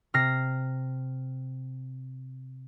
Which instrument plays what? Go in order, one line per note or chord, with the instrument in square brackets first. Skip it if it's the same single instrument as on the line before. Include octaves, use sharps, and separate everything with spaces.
[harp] C3 F6 A#6 C7